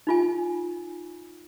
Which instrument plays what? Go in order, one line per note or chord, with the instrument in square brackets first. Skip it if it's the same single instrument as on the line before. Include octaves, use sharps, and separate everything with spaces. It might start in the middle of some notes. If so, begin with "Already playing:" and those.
[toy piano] D#4 F4 G#5